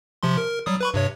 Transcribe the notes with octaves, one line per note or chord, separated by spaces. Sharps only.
C3 F3 C6
A#4
F#3 G3 D#6
B4 B5 C#6
G2 C3 C#5